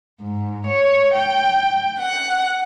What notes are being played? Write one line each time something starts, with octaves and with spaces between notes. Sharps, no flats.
G#2
C#5
G5
F#5